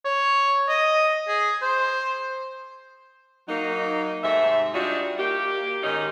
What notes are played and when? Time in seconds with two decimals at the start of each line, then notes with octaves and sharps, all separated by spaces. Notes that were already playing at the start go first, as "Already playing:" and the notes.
0.05 C#5
0.68 D#5
1.28 G#4
1.62 C5
3.48 F#3 A#3 D#4
4.24 G#2 C3 A3 E5
4.74 G3 D4 D#4 F4 F#4
5.19 A#3 G4
5.83 G#2 D#3 C#4 D#4